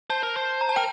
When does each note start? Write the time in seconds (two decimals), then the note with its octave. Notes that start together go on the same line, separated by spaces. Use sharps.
0.10 C5 A5
0.23 A#4
0.37 C5
0.61 A#5
0.69 A5
0.76 A#4 G5